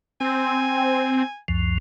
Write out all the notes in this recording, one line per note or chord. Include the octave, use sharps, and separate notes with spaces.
C4 G#5
C#2 F#2 F3